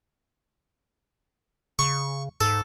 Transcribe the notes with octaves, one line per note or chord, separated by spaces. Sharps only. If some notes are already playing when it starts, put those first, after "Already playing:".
C#3 C#6
G#2 A4